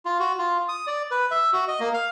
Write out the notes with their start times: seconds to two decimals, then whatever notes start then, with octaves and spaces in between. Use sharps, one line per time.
0.05 F4
0.19 F#4
0.38 F4
0.69 D#6
0.87 D5
1.11 B4
1.31 E5
1.53 F#4
1.68 D#5
1.80 A#3
1.94 F5